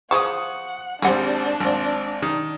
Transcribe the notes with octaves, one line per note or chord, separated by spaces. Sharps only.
F3 G#4 F#5 A5 C#6 D#6
G#1 G3 C4 D4 G#4 F#5
G#1 C4
D#3